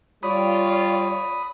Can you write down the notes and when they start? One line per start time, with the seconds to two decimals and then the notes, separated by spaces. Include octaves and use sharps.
0.23 G3 F4 C#5 D5 B5 D#6